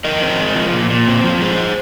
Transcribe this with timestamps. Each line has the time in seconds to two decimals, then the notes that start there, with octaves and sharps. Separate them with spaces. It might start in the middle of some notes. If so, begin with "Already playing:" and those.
0.04 F2 A#4 D#5
0.22 C4
0.39 G#3
0.55 F3
0.73 A#2
0.90 A#2
1.07 C4
1.24 F3
1.41 G#2 G#4 C5